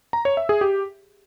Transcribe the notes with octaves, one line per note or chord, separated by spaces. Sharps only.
A#5
C#5
E5
G#4
G4